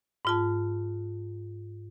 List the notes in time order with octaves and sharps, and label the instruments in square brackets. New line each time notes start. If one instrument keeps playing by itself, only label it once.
[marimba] G#2 F4 A5